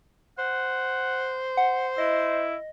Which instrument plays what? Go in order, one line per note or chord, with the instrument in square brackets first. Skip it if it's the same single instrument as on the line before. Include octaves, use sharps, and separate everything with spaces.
[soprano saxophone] C5 [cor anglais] F#5
[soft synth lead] F#5
[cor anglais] E4 [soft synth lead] D#5